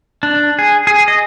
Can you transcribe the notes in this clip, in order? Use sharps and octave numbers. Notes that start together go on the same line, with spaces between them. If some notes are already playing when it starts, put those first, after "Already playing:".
D4
G#4
G#4
D#5